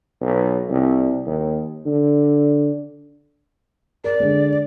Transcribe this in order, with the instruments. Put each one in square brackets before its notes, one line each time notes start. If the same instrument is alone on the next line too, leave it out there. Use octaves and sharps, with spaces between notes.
[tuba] B1
C2
D#2
D3
[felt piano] A#4 [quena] D5
[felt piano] D3 G#3